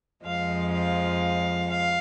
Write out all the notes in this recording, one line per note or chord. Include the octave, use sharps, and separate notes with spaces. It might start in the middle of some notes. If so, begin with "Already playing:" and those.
F2 F3 G#3 F5
F5
F5